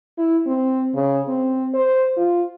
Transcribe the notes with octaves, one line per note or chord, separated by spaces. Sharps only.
E4
C4
C#3
C4
C5
F4